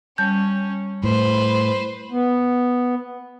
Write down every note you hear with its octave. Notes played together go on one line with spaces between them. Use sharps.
G3 C#4 A5 G6
A2 B4 C5
B3